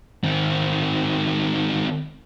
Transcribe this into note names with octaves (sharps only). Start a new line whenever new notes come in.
D#3 C4